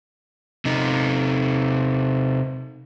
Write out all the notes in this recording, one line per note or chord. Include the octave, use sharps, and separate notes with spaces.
C3 D#4